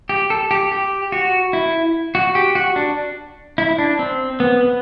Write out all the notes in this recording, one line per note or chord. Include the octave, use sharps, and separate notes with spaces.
G4
A4
G4
G4
F#4
E4
F#4
G4
F#4
D4
E4
D4
C4
B3
B3